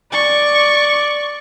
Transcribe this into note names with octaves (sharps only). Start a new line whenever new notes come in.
D5 C#6